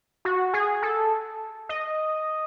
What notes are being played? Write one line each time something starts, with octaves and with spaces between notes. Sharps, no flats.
F#4
G#4
A4
D#5